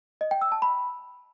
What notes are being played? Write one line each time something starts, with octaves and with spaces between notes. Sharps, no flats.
D#5
G5
E6
A5
B5